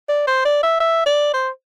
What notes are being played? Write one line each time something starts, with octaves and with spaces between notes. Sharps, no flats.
D5
C5
D5
E5
E5
D5
C5